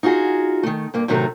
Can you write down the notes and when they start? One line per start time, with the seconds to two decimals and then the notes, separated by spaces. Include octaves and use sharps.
0.03 D#4 F4 F#4 G#4
0.63 D#3 A3
0.94 G2 A#3
1.08 A2 C3 D#3 F#3 F#4 A4